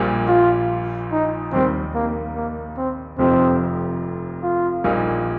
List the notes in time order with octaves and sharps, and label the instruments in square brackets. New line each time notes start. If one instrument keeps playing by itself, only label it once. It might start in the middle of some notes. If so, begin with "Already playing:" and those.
Already playing: [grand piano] A#1 A#2 G3 A#3
[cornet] F4
D#4
[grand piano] D#2 D#3 G3 [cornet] C4
[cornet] A#3
A#3
C4
[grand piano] F1 F2 F3 D#4 G4 [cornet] C4
[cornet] F4
[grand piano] A#1 A#2 G3 A#3 D#4